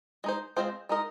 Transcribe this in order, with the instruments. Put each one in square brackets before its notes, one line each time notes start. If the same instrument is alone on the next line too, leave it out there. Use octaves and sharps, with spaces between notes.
[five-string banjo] G#3 D#4 C5
G#3 C4 F4 G#4 C5
G#3 D#4 A#4 D#5